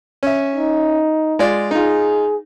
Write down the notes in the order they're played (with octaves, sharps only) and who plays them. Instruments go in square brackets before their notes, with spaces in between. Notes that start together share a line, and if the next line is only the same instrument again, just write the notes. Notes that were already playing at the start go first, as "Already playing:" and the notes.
[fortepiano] C#4 E5
[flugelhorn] D#4
[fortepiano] G#3 F4 D5
[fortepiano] D#4 F4 [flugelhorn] G#4